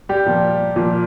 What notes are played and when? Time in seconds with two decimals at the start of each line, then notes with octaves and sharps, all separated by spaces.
0.09 G3 G4
0.26 A#2 F3
0.76 A#2 F3